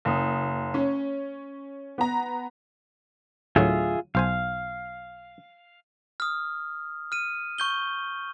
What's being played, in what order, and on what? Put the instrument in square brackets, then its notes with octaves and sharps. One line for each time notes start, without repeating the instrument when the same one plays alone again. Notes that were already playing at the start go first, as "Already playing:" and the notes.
[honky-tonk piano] F#1 D#6
C#4
B3 A#5
[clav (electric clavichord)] D2 A2 F#3 [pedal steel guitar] F4 G#4 E5
[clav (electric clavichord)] B1 C5 G#5 [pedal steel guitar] F5
[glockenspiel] D#6 F6
F6 D#7
C#6 G6 G7